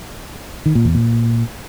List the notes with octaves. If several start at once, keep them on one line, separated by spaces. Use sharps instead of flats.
D#3
A#2
E2
A#2